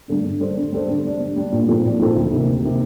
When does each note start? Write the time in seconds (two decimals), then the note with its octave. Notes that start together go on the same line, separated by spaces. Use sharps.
0.08 G2 D3 A3 D4
0.25 D3
0.40 G3 D4 A4 C5
0.57 D3
0.72 G3 D4 A4 C5
0.88 D3
1.04 G3 D4
1.20 D3
1.36 G3 D4
1.52 A#2
1.68 F3 C4 D#4 A4
1.85 A#2
1.99 F3 C4 D#4 A4
2.16 D2
2.31 C3 D#3 A#3
2.47 D2
2.64 C3 D#3 A#3